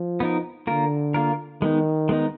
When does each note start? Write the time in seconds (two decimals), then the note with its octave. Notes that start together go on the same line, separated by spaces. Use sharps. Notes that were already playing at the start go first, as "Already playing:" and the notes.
Already playing: F3
0.20 B3 D#4 A#4
0.67 D3 A#3 F4 A#4
1.14 A#3 F4 A#4
1.62 D#3 G#3 B3 D#4
2.09 G#3 B3 D#4